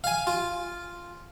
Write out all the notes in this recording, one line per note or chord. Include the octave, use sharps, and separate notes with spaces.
F5 G#5
F4